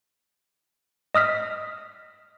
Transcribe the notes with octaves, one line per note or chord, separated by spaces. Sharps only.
D#5 D#6 F6 B6